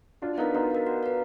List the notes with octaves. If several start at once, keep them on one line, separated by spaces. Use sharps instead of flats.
D4 F4 F#4
B3 D#4 A#4 F5
B3 D#4 F#4
A#4 F5
F#4
B4 F5